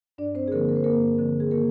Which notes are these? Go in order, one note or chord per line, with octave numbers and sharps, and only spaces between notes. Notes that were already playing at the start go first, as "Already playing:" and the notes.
G2 D4 D5
C4 C5
G#4
D3 F3 A#3 C4 A#4
A#4
C5
G2 A#3 A#4
D3 F3 C4
G#4
D#3 A#3 A#4